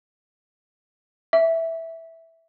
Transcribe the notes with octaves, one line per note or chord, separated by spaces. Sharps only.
E5